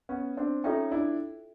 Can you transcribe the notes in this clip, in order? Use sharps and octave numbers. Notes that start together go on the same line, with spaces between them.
B3 C#4
C4 D4
C#4 D#4 F4 A4 C#5 E5 G5
D4 E4